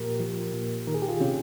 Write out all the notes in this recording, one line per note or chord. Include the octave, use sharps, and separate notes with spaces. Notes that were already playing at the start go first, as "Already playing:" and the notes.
Already playing: A#2 F3 G4 A#4
F3
A#2
D#3 A#4
G#4
G4
F4 G#4
C3 C#4 F4